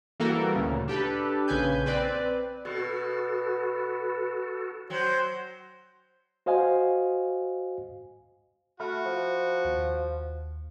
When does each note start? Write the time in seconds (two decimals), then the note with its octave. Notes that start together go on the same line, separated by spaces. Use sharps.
0.20 E3 G3 A#3 F#4 A4 A#4
0.55 D2 A#2 C#3
0.88 D4 G4 A4 B4
1.48 A#1 C#3 B4 G#5 G6
1.86 C4 B4 D5
2.65 B2 F#4 A4 B4
4.90 F#3 C5 G5
6.46 F#4 C5 D#5 F5 G#5
8.80 A3 F#4 B5 F6
9.06 F3
9.65 D#2